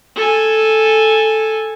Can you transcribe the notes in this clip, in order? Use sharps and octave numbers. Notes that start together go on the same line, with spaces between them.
A4 G#5